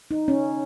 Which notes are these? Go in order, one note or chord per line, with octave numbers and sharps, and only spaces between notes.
D#4
C#4